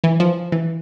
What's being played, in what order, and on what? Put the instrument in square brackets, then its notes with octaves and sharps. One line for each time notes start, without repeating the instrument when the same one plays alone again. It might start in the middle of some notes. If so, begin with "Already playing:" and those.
[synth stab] E3
F3
E3